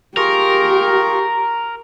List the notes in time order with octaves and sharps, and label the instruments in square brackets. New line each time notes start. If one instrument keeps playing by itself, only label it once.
[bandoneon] F4 G#4 C#6 [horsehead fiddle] G4 [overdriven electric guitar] A#4